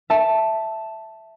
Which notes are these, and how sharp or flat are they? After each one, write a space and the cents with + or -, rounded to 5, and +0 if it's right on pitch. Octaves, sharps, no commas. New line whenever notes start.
E5 +0 A5 +0